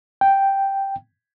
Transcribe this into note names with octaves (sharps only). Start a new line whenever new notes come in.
G5